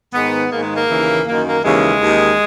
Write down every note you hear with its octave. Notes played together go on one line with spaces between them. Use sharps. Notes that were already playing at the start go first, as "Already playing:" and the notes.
G#2 D#3 B3
G#2 D#3 A#3
G#3
A#3
D#2 C#3 E3
F#2 D#3 A#3
A#3
D#2 C#3 E3 G#3
D#2 D#3